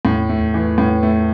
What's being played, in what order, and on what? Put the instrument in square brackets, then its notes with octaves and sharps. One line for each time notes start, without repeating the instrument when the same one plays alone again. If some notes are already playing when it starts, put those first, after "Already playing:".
[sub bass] E2 [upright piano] A2
[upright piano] A3
[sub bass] E2
[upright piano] E3
A2
A3